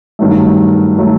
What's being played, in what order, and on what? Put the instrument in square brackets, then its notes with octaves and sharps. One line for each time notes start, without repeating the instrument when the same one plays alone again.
[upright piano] G2 D#3 F#3 A3
D#3 F#3 A3